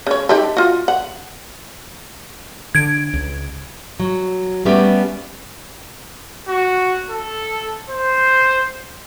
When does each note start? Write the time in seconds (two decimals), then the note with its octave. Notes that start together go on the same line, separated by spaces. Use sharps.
0.07 C#3 C#5
0.29 D#4 G4 A4
0.57 F4 F#4
0.88 F#5
2.75 D3 G#6 D7
3.13 C#2
4.00 F#3
4.65 G3 A3 B3 C#4 G4
6.48 F#4
7.09 A4
7.90 C5